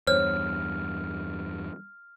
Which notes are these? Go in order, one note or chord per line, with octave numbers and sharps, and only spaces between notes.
E2 G2 C5 C#5 F6